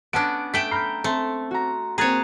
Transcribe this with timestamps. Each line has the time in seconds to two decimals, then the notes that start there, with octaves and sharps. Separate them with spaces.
0.13 B3 C#4 D4 A5 D7
0.54 A3 G5 B6 D7 E7
0.71 A#5 B5 F6 G6 C7
1.04 A3 C4 A5 C6
1.51 F#4 A#5
1.98 A#3 C4 G#4 C#5 A#5 F#6 A6